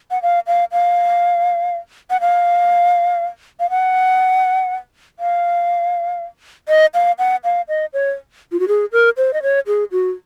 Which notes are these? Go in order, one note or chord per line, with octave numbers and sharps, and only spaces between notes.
F#5
F5
F5
F5
F#5
F5
F5
F#5
F5
D#5
F5
F#5
F5
D#5
C#5
F4
F#4
G#4
A#4
C5
D#5
C#5
G#4
F#4